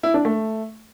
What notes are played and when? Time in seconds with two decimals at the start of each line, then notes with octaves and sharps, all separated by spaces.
0.03 E4
0.14 D4
0.25 A3